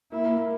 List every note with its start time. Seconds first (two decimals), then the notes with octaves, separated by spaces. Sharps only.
0.12 A#3 E4
0.25 A#3
0.37 A#3